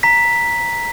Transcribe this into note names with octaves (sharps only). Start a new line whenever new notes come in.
A#5 B6